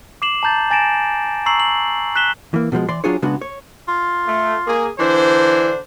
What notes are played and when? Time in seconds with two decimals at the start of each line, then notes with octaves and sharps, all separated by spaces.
0.22 D6 C7 E7 F#7
0.43 A5 A#5 G6 A6
0.71 G#5 A6 A#6 D7 E7
1.46 A#5 C#6 E6 C7 F#7
1.60 F#7
2.16 F#6 B6 E7 G7
2.54 E3 A#3
2.72 B2 D3 F3 G#3
2.89 E3 D5 C6
3.04 F#3 D4 F4 G#4 C#5
3.22 C#3 G#3 B3 D4 F#4
3.41 C#5
3.88 F4
4.27 A3
4.67 A#3 G#4
4.99 D3 E3 D4 C5